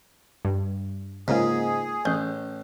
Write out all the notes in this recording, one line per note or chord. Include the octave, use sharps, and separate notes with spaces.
G2
G#2 C#3 A#3 F4 G#4
A1 C#4 G6